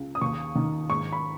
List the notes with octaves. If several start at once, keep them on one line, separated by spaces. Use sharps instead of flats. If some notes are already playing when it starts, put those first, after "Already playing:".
Already playing: C#2
D#6
D#2 C#6
D#3
G#2 C#6
B5